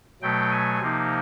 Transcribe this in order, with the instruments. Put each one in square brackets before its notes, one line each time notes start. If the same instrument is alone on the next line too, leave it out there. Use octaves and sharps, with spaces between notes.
[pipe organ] B2 F#3 A3 G5
G#5
C3 F3 A#3 D#4